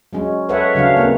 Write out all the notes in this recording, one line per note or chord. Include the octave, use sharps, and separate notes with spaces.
F#3 G#3 C#4
A4 B4 C#5 E5 F#5
C#3 F#3 C#4 D4 F5
A#3 C4 C#4